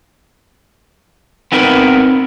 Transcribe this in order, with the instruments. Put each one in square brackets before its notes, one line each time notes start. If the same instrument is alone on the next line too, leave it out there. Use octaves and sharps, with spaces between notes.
[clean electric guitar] B3 C4 D#4 A#4 B4